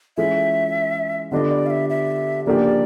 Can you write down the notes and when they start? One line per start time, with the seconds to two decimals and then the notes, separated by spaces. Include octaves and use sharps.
0.17 E3 G#3 C#4 F4 G#4 E5
1.31 D3 G3 B3 D4 F4 D#5
1.51 D5
1.66 F5
1.70 E5
1.90 E5
2.46 C#3 F3 A#3 D4 G4 D5